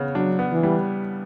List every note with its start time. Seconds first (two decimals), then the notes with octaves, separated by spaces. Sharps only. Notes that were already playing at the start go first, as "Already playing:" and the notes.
Already playing: C#3 B3
0.15 F#3 D4
0.39 B3
0.52 E3
0.63 G3